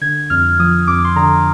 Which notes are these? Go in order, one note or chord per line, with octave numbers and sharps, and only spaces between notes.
D3 G#6
F2 F6
F3 D#6
F2 D6
C6
D3 A#5